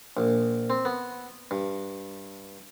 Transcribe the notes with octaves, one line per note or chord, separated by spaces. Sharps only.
A#1
C4
B3
G2